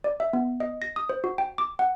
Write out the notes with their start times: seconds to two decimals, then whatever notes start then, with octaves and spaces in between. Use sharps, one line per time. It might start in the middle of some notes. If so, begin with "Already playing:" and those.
0.04 D5
0.20 E5
0.33 B3
0.60 D#5
0.82 A#6
0.96 D#6
1.09 C5
1.24 F#4
1.38 G5
1.58 D6
1.79 F#5